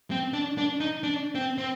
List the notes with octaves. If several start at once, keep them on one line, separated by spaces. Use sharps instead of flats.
C4
D4
D4
D#4
D4
C4
C4